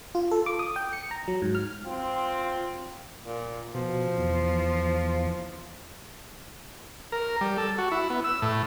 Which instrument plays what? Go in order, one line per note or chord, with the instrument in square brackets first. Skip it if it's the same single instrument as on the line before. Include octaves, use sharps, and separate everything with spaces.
[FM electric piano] F4
A4
D6
D#6
G5
C#7
A#5
F#3
G#2
F6
[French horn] C4 [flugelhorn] F4
[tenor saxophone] A#2
[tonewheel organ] B2 [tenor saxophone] F3
[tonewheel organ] E2
[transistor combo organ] A#4
G3
A4
F#4
E4
B3
E6
A2